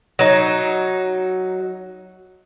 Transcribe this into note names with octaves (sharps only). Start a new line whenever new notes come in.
F#3 D#4